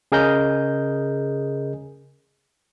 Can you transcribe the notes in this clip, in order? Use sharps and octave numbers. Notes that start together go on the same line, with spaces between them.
C#3 G#4 A#4 D#5 G6